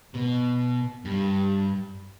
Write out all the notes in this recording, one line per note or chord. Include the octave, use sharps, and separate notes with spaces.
B2
G2